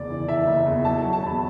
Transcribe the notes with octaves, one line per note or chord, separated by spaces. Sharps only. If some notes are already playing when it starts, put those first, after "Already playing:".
Already playing: F#1 E2 D5
E3
E3 E5
F#1
E2
F#3 A5
F#3
A5
E2 B5